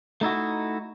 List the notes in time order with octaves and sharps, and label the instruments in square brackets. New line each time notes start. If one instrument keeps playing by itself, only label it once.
[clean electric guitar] A3 D#4 E4 F#4